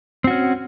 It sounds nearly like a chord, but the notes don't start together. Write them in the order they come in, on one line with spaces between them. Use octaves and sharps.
C4 F#4 C#4